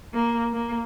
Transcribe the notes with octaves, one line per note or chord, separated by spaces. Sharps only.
A#3
A#3